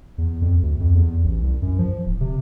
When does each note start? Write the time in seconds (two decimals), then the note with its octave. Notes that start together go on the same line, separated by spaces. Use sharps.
0.18 E2
0.42 F2
0.63 D2
0.80 F2
0.95 E2
1.24 A1
1.42 C2
1.62 F#2
1.79 F3
2.06 D1
2.21 C3